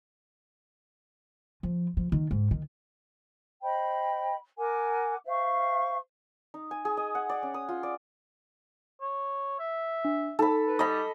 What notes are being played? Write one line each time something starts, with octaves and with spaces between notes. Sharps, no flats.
F3
F3
D#3
G#2
D#3
C5 D#5 G5 B5
A#4 F#5 G#5 D6
C5 E5 F5 C#6
D#4
G#5
G#4
D#5
F#5
D5
C#4
D#6
F4
D5
C#5
E5
D4
D#4 A4 B5
B4
G3 D#5 B5